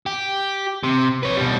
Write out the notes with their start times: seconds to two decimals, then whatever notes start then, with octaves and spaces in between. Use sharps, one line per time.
0.06 G4
0.83 C3
1.23 B4 C#5
1.37 B2 G3